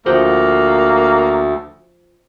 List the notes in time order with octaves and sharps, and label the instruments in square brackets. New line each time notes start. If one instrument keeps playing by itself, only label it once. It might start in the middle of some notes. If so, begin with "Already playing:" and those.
[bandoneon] D2 [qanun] F3 F#5 G5 [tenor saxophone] A#3